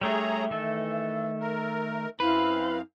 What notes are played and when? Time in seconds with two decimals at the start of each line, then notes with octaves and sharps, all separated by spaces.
0.01 G3 A3 D4 G#4 C#5 E5 A#5
0.50 D#3 E3 A3 A4
1.40 A#4
2.20 F#2 C4 E4 B4 F5